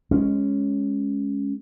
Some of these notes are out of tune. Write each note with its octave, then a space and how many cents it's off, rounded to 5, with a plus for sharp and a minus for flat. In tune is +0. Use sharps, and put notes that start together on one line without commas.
G#3 +0 C#4 +0